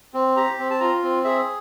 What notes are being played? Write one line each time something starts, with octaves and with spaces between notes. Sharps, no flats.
C4
G4 A#5
C4
A5
F4 A#5
C4
G#4 E5